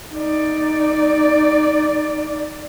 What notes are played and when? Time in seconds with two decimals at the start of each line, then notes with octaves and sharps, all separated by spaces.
0.13 D#4 D5